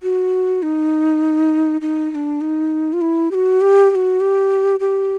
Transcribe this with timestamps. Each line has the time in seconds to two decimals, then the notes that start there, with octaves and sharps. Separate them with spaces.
0.03 F#4
0.63 D#4
1.81 D#4
2.11 D#4
2.15 D4
2.41 D#4
2.93 F4
3.01 E4
3.31 G4
3.35 F#4
3.61 G4
3.90 G4
3.95 F#4
4.20 G4
4.80 G4